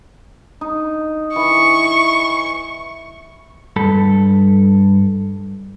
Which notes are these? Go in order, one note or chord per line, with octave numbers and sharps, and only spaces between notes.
D#4
E3 C#6
G2 A4 B5